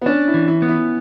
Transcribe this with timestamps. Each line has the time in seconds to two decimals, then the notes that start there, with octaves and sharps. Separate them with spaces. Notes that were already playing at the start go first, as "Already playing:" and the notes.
0.01 B3
0.06 C#4 D4
0.28 E4
0.34 E3
0.48 E4
0.62 B3
0.69 E4